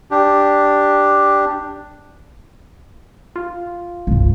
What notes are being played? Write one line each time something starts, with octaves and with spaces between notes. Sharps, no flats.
D4 G4
F4
C2 G2